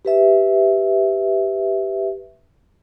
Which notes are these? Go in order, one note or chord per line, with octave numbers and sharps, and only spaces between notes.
G4 B4 E5